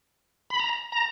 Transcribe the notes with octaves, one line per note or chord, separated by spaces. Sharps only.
B5
A#5
A#5